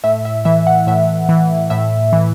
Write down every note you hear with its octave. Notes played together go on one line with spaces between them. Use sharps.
A2 E5
E5
E3 E5
F#5
A2 E5
E3
A2 E5
E3